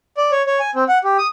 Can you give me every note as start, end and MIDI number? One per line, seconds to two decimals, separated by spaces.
0.17 0.31 74
0.32 0.42 73
0.47 0.59 73
0.60 0.71 80
0.75 0.84 60
0.88 0.98 78
1.04 1.17 67
1.18 1.27 87